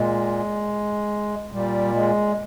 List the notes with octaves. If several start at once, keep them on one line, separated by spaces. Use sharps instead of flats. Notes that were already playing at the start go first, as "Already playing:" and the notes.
Already playing: A#2 G#3
A#2 G3
G#3